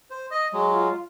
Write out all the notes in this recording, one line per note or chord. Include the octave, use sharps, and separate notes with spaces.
C5
D#5 D#6
F#3 G#3
F4